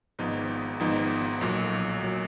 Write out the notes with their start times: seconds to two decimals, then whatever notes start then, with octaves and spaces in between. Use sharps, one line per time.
0.19 G#1 G#2 F3 B3 D#4
0.80 G#1 G#2 F3 B3 D#4
1.41 B1 A#2 F#3
2.00 B1 A#2 F#3